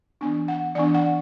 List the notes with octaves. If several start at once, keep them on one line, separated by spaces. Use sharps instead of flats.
E3 B3 D4
F#5
E3 B3 D4 D5
F#5